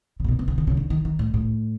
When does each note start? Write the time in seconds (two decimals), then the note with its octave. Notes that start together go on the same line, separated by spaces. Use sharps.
0.20 C#3
0.24 A#2
0.28 B2
0.39 C3
0.48 C#3
0.58 D3
0.67 C#3
0.77 D3
0.90 D#3
1.05 D#3
1.19 A2
1.34 A2